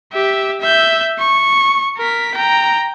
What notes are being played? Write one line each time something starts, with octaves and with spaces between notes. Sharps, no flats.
G4 E5
E5 G6
C#6
A#4 B6
G5 A#5